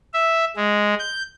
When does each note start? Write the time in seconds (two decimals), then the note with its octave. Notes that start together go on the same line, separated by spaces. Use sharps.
0.14 E5
0.56 G#3
0.99 G6